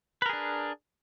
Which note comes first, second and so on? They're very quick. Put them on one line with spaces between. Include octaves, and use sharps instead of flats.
B4 A#4 G#4 D4